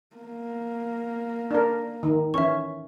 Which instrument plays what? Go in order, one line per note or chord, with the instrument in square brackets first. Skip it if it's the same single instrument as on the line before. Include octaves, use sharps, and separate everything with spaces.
[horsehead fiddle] A#3
[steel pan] D4 A#4
D#3
[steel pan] E3 C#4 [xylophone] E5 C#6